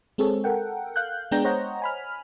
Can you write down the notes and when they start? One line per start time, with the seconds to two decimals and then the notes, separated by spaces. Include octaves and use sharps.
0.18 G#3 C4 G#4 A4 C#5
0.44 A4 A#4 F#5 G5
0.96 F5 F#6 G6
1.31 G#3 B3 D4 G5 A#5 G6
1.45 C5 C#5 D#5 F#5 A#5
1.82 G#5 B5 F6